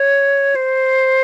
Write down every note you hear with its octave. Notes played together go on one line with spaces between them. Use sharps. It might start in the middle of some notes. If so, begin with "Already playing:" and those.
Already playing: C#5
C5